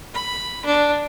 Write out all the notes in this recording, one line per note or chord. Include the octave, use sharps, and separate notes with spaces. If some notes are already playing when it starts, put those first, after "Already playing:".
B5
D4